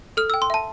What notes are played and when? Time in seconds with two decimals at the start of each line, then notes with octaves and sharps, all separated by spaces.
0.17 A4 F6
0.30 E6
0.34 G5
0.42 C6
0.50 E5 A5